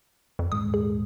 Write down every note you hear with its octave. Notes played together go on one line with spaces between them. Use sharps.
F2
D#1 G#2 G#3 D#6
G#4